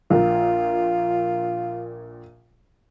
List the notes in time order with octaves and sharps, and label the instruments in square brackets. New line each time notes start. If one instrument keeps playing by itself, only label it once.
[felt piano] A#1 A#2 [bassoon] F4